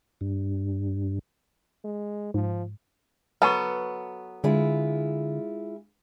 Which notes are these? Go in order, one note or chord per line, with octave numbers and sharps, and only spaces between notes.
G2
G#3
G#2 F3
F#3 B3 A4 B4 A5 C#6
D3 G#3 E4 F4